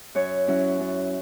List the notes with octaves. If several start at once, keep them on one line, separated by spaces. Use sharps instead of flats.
F#2 C#5
F#3 C#4 E4
F#2